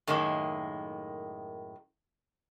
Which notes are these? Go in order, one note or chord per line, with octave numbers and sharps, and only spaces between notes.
F#2 A2 D#3 G#3 A#3